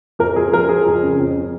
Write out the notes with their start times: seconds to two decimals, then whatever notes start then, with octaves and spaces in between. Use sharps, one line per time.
0.19 F2 A#4
0.36 F3 G#4
0.53 F3 A#4
0.69 F3 G#4
0.86 F2
1.03 C#3
1.19 F2